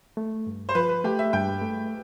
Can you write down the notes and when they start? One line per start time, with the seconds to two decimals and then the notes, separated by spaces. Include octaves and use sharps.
0.17 A3
0.47 G2
0.69 C5
0.75 F3 B4
0.89 B4
1.04 A3 G4
1.19 E5
1.33 G2 G5
1.62 A3